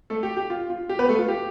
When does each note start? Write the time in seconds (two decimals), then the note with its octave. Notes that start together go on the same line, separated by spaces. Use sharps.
0.10 A3 A4
0.23 G4
0.37 G4
0.50 F4
0.70 F4
0.89 G4
0.99 B3 B4
1.09 A3 A4
1.18 F4
1.28 G4